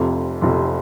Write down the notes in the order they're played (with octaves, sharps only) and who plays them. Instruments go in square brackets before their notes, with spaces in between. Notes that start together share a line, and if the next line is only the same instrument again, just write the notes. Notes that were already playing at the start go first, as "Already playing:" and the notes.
Already playing: [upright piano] F1 F2 C3
F1 F2 C3